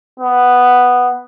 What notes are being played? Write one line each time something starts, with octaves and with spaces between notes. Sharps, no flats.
B3